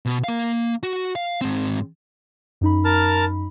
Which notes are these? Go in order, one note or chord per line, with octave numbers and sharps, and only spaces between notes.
B2
A#3 F5
F#4
F5
G#2 C4
F#2 D#4 B5
A#4 A5 F6